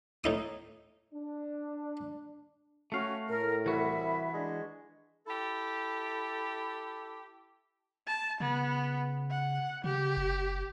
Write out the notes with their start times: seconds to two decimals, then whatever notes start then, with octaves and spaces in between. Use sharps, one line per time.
0.24 A2 D#4 D#6
1.14 D4
2.92 A3 C#4 F#4 F5
3.29 A2 A#4 F6
3.66 C2 E3 F#4 E5 B5
4.33 G#3 D4
5.27 E4 G4 A4
8.07 A5
8.40 C#3 B3
9.31 F#5
9.84 C#3 G4
10.17 F#1